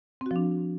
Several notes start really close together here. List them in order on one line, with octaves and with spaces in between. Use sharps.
C4 F#4 F3 D4